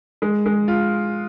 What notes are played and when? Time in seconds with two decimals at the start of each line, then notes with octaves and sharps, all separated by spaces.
0.22 G#3
0.46 G#3
0.68 F4